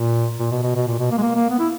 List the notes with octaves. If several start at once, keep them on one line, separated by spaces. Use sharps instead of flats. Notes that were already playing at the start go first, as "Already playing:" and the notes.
Already playing: A#2
A#2
B2
B2
B2
A#2
B2
A#3
G#3
A#3
A#3
B3
E4